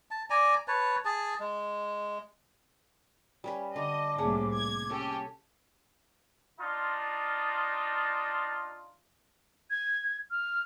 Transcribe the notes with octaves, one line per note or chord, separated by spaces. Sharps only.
A5
D5 G#5 A#5
B4 C#5 A5
G#4 A5
G#3
G3 C#4 B4 G#5
D3 D#5 D6
C2 A2 A#3 C#4 G#4 A5
G#6
C#4 G4 A4
D4 D#4 F4
G#6
F6